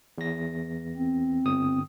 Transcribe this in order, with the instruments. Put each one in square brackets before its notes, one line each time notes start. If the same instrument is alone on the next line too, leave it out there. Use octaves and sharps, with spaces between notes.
[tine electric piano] E2 A#6
[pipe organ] C4
[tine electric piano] G1 D#6